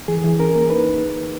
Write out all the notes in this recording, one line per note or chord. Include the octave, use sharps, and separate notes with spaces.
E3 G#4
E3
C#4 A#4
A#3
D#4 B4